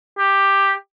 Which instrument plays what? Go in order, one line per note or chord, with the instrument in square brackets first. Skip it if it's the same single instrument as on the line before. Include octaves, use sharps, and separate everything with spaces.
[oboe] G4